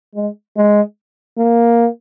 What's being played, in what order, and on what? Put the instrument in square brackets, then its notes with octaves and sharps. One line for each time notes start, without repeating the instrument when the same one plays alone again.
[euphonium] G#3
G#3
A#3